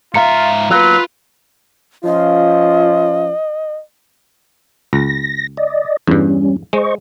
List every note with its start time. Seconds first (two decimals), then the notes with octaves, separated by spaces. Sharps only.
0.14 G#2 F4 E5 F5 A#5 C#7
0.71 F#3 A#3 B3 F4 B4
2.04 F3 C#4 F4 D#5
4.93 C#2 A#6
5.57 D5 D#5
6.07 E2 G2 G3 C#4
6.73 G#3 C5 D#5 C#6